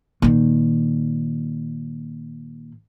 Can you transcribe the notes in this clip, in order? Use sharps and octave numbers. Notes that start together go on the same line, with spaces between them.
A#2 D#3